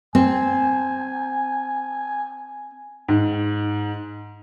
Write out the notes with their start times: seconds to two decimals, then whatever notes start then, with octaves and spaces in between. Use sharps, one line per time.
0.15 C4 G#5
3.08 G#2